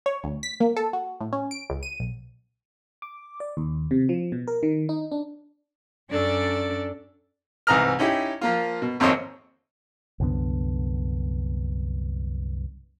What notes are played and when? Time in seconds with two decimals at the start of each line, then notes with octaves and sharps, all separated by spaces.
0.06 C#5
0.24 D2
0.43 B6
0.60 A#3
0.76 A4
0.93 F#4
1.20 A2
1.33 C#4
1.51 D7
1.70 C#2
1.83 D#7
2.00 B1
3.02 D6
3.40 D5
3.57 D#2
3.91 C3
4.09 F3
4.32 B2
4.47 A#4
4.63 D#3
4.89 D#4
5.12 D4
6.10 F#2 C#4 D4 A4 D5 A6
7.67 C2 G#2 E3 A#5 D#6 F6
7.99 C#4 D#4 E4 G4
8.41 F3 A#3 F4
8.82 B2
9.00 G#1 F2 A#3 C5 C#5 D#5
10.20 C2 F#2 D3 B3